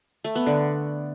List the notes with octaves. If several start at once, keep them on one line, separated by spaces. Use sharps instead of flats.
A3
B3
D3